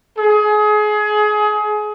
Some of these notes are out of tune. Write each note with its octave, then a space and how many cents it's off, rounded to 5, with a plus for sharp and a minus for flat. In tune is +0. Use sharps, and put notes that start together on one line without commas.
G#4 +25